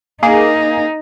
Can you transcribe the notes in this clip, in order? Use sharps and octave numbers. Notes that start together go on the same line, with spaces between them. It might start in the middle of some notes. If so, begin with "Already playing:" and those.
A#3 D#4 G#4